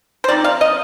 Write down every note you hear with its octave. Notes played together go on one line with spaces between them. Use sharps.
C5
F3 C4 D#4 D5
F5
D#5